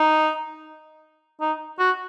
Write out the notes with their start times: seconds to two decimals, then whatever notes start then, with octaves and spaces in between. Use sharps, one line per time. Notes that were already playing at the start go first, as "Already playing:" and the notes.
Already playing: D#4
1.41 D#4
1.79 F#4